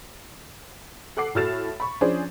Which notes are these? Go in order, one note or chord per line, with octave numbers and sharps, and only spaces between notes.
A4 F#5 D6 C7
A2 F#4 A4 F6 A6 E7
B5 C#6
F3 C#4 D4 G#4 C5